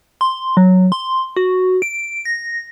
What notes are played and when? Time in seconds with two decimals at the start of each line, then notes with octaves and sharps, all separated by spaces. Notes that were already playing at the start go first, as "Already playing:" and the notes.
0.21 C6
0.57 F#3
0.92 C6
1.37 F#4
1.82 D7
2.25 A#6